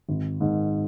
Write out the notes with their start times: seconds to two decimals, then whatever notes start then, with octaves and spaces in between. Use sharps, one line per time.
0.09 G#1
0.41 G#2 D#3